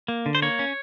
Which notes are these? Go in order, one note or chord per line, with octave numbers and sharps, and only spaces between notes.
A#3
D3
C5
A#3 C#5
C#4